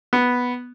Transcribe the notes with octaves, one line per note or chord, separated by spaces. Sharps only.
B3